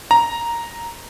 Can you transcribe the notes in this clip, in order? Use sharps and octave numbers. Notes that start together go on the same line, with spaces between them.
A#5